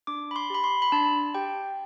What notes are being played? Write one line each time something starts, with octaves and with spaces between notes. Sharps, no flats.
D4 D6
B5
C6
G4 B5
C6
B5
D4 A5
G4 G5